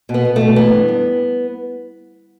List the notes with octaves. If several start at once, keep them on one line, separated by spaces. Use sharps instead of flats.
B2
B3
B2
B2 A3
E3 B3
G2
G2